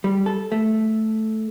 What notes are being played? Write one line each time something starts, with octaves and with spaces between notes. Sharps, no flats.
G3
A4
A3